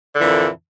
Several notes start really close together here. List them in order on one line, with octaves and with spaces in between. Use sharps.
D3 E3 F2 A#2